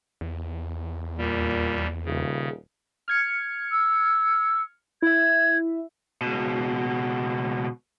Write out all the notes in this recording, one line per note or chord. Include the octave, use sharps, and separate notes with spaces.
E2
D#2 A#2 G3
D#1 C#3
F6 G#6 C#7
E6
E4 E5 G#6
C#2 B2